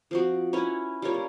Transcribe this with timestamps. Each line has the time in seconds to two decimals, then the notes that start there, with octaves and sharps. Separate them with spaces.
0.11 F3 C4 F#4
0.53 C#4 E4 B4 C#5
1.02 G3 F4 A#4 C#5
1.14 C#4